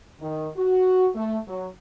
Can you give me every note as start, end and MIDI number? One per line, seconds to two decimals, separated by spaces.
0.20 0.49 51
0.57 1.08 66
1.15 1.38 57
1.48 1.67 54